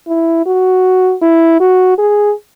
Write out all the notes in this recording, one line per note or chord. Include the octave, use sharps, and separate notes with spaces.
E4
F#4
E4
F#4
G#4